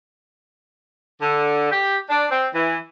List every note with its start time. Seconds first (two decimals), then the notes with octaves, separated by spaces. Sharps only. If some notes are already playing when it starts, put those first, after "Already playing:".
1.21 D3
1.71 G4
2.09 D4
2.30 C4
2.54 E3